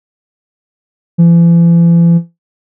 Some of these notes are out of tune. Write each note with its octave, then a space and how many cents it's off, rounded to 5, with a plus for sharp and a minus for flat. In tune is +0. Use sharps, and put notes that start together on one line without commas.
E3 +45